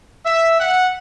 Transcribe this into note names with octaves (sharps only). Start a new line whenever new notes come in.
E5
F#5